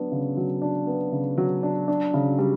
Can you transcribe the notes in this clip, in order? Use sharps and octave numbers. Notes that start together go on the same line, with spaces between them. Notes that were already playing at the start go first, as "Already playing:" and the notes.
Already playing: F#3 B3 D4
C#3
F#3
D4
B3
C#3
F#3
D4
D4
C#3
G3